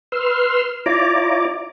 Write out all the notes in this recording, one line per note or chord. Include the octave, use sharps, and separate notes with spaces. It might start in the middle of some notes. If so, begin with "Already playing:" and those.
B4 C6 E6 F6
E4 F4 C#5 D5 A#5 D6